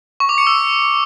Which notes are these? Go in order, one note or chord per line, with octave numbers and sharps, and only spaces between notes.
C#6
D6
C#7
E6